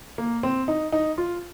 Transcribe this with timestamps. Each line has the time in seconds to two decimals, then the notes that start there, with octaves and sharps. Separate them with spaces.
0.18 A#3
0.43 C4
0.68 D#4
0.92 D#4
1.18 F4